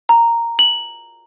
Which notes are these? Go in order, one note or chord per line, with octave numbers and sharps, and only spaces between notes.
A#5
F#7